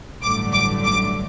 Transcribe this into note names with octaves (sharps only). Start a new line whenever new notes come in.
A1 G2 D3 F#3 A3 D6
D6
D6